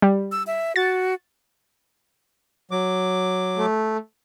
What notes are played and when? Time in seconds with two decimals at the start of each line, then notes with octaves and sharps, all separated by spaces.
0.02 G3
0.32 E6
0.47 E5
0.76 F#4 A6
2.71 F#3 D6
3.57 A3